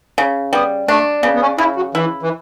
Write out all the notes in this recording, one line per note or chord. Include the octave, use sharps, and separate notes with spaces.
C#3
G3 B3
A3 D4
C#3 B3
B3
C#4
C#3 E4
F#3
E3 E4
E3